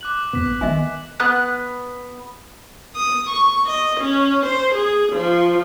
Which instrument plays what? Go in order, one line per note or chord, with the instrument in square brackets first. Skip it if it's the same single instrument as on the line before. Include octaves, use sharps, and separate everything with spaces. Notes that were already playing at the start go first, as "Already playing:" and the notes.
[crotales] D6 F#6 F#7
[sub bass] D#2 [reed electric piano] B3 [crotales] D6 B6
[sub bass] A1
[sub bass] D#3 [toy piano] D#5 E5 G#5
[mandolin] B3 F#6
[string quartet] D#6
C#6
D#5
C#4
C5
G#4
F3